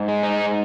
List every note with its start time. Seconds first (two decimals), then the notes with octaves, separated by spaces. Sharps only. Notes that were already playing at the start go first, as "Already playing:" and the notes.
Already playing: G#2
0.08 G#3
0.23 D#4
0.31 G#2